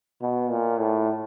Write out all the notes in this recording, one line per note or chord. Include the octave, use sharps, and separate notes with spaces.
B2
A#2
A2